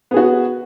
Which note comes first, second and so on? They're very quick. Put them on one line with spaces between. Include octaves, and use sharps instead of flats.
B3 G#4 F#4